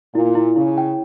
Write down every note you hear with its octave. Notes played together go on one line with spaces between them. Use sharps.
A#2 E4
E4
C#3 E4
G5